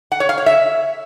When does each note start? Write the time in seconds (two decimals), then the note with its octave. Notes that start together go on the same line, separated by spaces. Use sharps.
0.12 F#5
0.20 C#5
0.29 F5
0.38 C#5
0.46 E5